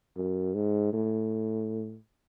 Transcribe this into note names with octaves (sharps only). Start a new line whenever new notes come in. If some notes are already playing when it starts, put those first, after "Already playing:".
F#2
G#2
A2